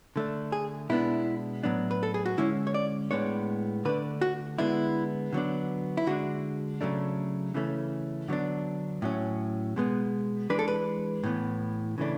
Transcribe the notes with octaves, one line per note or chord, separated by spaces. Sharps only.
D3 A3 D4
G#4
B2 G#3 B3 D4 E4
A2 F#3 B3 D4
B4
A4
G#4
F#4
D3 G#3 C#4 E4
C#5
D5
A2 G#3 B3 D4 C#5
D3 A3 D4 B4
F#4
D3 G#3 B3 D4 E4
D3 F#3 B3 D4
E4
D3 G#3 D4 F#4
C#3 F#3 A3 D4
C#3 E3 A3 C#4
D3 F#3 B3 D4
A2 F#3 C#4
B2 G#3 B3
E3 G#3 D4 B4
A4
B4
A2 E3 B3
C#3 E3 A3 D4